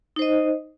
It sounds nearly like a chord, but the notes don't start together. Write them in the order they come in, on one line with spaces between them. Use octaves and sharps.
D#4 C5 D#5